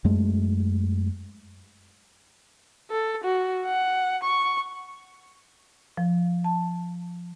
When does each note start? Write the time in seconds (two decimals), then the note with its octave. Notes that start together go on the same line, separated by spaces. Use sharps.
0.05 F#2 G#3 A3
2.90 A4
3.24 F#4
3.66 F#5
4.23 C#6
5.97 F3
6.44 A5